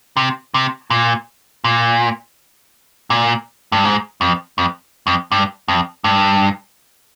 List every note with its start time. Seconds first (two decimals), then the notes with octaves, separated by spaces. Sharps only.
0.17 C3
0.54 C3
0.90 A#2
1.64 A#2
3.10 A#2
3.72 G2
3.85 G#2
4.21 F2
4.58 F2
5.07 F2
5.32 G2
5.68 F2
6.04 G2